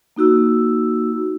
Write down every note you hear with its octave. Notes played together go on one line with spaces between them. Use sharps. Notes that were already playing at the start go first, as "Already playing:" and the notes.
A#3 D#4 F#4 E6